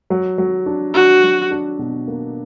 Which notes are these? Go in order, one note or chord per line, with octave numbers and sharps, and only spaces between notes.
F#3
F#3
D4
D4 F#4
F#3
D4
B2
A#3